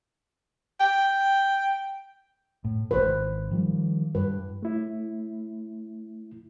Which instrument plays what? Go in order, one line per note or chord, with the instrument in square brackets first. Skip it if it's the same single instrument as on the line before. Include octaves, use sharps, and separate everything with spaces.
[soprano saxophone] G5
[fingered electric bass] A2
[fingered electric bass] D#1 G#1 [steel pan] B4 C5
[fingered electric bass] D#3 F3 G3
[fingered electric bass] G2 [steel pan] B4
[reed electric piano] A3 E4